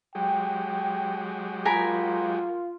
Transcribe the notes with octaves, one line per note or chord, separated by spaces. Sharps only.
F#3 G#3 G4 G5
F4 A#4 G#5 B5